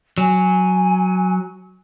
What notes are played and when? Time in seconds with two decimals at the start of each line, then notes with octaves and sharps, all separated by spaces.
0.18 F#3 G#5